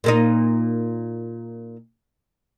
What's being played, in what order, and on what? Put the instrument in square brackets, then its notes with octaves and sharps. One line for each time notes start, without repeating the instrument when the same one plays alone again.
[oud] A#2 A#3 D#4